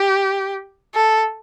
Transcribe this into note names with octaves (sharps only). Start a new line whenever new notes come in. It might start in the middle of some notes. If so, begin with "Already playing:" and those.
Already playing: G4
A4